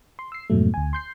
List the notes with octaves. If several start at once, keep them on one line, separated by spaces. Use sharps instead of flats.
C6
E6 C7
F2 G#2 B2 F#3 A3
D2 G#5
C6 G6 C7